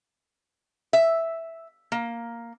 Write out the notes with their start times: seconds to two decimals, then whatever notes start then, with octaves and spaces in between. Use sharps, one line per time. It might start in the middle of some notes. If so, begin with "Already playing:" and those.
0.93 E5
1.92 A#3